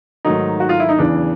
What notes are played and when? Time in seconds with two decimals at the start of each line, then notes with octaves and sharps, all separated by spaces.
0.25 G#2 D#3 F#3 A3 D#4
0.60 F#4
0.69 F4
0.80 E4
0.89 D#4
0.99 E2 C#3 E3 D4